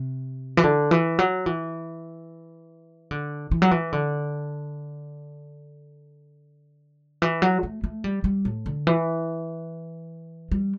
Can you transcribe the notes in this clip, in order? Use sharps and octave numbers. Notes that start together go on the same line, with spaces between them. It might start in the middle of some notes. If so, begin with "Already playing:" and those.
Already playing: C3
E3
D3
E3
F#3
E3
D3
E3
F#3
E3
D3
E3
F#3
A3
A3
G3
G3
A2
D3
E3
G3